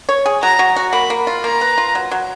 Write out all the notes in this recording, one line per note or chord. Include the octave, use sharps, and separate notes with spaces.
C#5
G#4
F#3 A#5
F#3
F#4
A#3 B5
A#3
F4
A#3 A#5
B4
F4
F#3
F#3